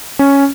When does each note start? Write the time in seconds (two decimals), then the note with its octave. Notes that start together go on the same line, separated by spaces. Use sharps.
0.19 C#4